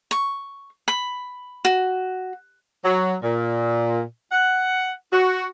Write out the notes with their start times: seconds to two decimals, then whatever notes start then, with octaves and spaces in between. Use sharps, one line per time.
0.11 C#6
0.88 B5
1.65 F#4
2.85 F#3
3.23 A#2
4.32 F#5
5.13 F#4